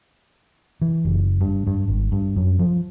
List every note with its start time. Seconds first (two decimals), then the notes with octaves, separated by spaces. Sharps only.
0.82 E3
1.05 F#1
1.41 G2
1.67 G2
1.88 G#1
2.12 G2
2.36 F#2
2.59 F3